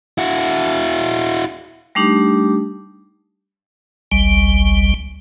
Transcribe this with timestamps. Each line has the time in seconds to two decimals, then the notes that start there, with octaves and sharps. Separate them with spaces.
0.18 E4 F#4
1.95 G3 A3 D4 D#4 G4
4.12 G#1 C#2 G3